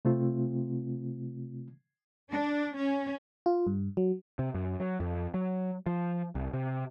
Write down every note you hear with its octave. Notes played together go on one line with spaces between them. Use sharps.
C3 A3 C4 F4
D4
C#4
F4
G2
F#3
C3
F#2
F#3
F2
F#3
F3
C2
C3